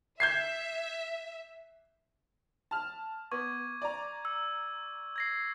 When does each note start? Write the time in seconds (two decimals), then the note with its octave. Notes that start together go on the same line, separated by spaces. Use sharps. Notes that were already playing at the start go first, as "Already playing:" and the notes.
0.20 E5 G6 G#6 C7
2.71 A5 F6
3.32 B3 C#6 D6 G#6
3.82 D5 A#5
4.25 E6
5.16 G#6 A#6 C7